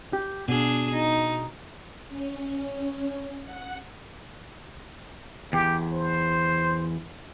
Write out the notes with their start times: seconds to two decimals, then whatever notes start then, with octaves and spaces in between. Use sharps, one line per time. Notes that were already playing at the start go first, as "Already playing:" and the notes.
0.13 G4
0.48 B2 D4 G#4
0.92 D#4
2.09 C#4
3.44 F#5
5.53 E2 G4
5.93 C5